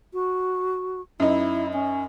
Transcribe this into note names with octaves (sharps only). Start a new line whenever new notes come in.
F#4
F#2 D#4 E4
C#4